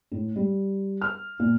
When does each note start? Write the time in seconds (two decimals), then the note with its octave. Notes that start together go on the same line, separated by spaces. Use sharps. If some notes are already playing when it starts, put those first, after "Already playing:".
0.12 A2
0.36 G3
1.01 F6
1.40 A#2